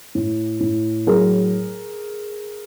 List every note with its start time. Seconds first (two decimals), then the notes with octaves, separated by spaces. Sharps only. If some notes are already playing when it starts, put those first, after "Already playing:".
0.15 A2
0.60 A2
1.07 F#3 G#4 A#4